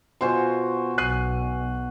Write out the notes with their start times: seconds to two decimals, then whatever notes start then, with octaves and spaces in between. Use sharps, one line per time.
0.21 B2 F4 F#4 C5 G#5 C6
0.98 B1 F#6 C7 D#7